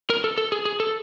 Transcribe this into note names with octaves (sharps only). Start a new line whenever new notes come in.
A#4
A4
A4
G#4
G#4
A4